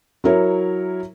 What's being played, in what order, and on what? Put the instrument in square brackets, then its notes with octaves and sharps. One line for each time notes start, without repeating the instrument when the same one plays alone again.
[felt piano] F#3 E4 A#4 C#5